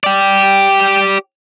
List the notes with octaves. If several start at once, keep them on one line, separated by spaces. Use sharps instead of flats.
G4 D5